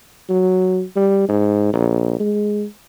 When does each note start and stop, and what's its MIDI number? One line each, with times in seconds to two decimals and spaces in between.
0.29 0.82 54
0.96 1.26 55
1.28 1.73 44
1.73 2.15 34
2.20 2.65 56